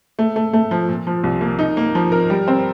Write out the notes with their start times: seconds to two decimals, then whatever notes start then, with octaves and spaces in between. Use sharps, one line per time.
0.19 A3
0.36 A3
0.53 A3
0.71 F3
0.89 A#2
1.07 F3
1.24 C2
1.41 A#3
1.59 D#4
1.77 A#3
1.95 F3
2.12 A#4
2.30 G3
2.48 C4